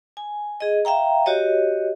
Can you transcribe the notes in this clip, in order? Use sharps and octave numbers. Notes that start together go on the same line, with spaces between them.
G#5
G#4 D#5
E5 F5 G5 A#5
F#4 G4 C#5 D#5